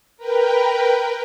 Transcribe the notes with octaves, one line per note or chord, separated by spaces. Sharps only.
A#4 B4 G5